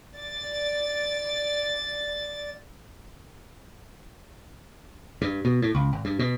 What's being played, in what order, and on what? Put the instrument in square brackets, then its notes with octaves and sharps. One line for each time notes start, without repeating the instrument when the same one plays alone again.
[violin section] D5 A6
[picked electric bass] G2
B2
A2
C#2
G#1
G2
B2